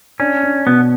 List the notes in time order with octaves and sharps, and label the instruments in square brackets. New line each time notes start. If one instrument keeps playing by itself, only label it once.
[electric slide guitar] C#4 [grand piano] D4
[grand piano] D4
[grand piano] B2 [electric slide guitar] B3